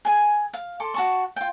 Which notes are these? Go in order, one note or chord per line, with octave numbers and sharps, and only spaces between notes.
G#4 G#5
F5
A4 C6 D6
F#4 A5 C#6
F4 G5